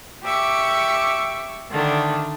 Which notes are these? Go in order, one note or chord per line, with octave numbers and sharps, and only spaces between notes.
G4 E5 C#6 D6
D3 D#3 A3 D4